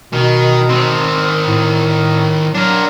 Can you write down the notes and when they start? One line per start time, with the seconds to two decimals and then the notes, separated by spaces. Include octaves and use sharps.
0.13 B2 D#3
0.69 D#3 C4
1.47 A2
2.55 F#3 D4 A#4